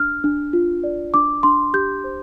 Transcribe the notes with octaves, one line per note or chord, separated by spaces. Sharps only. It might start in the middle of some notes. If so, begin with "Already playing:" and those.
Already playing: D4 F6
D4
F4
D5
D4 D6
D4 C6
G4 G6
C5